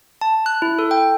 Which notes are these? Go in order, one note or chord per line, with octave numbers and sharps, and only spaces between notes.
A5
F#6
E4
A4
G5